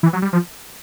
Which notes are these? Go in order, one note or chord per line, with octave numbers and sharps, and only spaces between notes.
E3
F#3
G3
F3